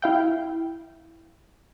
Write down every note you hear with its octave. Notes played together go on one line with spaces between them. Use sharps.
E4 F5 G5